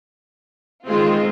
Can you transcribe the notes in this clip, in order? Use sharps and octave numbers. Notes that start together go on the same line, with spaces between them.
D#3 G#3 C4 F4